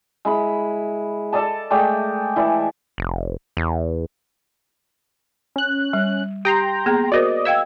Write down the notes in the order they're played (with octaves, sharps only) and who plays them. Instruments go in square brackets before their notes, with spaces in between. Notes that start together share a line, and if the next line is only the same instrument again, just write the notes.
[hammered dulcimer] G#3 E4 B5
A4 D5 D#5 A5
G#3 A3 D5 G5
E3 E4 D5
[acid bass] F1
E2
[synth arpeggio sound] C#4 F#6
[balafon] G3
[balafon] G4 [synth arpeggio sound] G5 A#5 C6
[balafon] A#3 B3 G#4
[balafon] F#4 A#4 C5 [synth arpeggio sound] D5 D#5
[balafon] D#5 F5 G5 [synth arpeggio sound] E6 G#6